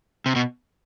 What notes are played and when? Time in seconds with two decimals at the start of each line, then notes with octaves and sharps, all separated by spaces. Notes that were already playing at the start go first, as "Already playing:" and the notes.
0.26 C3
0.36 B2